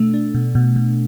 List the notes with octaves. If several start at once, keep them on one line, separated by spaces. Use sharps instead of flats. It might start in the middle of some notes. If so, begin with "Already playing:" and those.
Already playing: B2 A3 D4
D4
B2
B2
B2